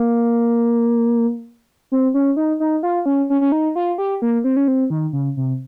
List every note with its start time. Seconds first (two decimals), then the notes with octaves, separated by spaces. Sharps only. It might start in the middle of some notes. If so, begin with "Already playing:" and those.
Already playing: A#3
1.92 C4
2.14 C#4
2.37 D#4
2.60 D#4
2.83 F4
3.06 C#4
3.30 C#4
3.41 C#4
3.52 D#4
3.76 F4
3.98 G4
4.22 A#3
4.44 C4
4.57 C#4
4.68 C4
4.90 D#3
5.13 C#3
5.37 C3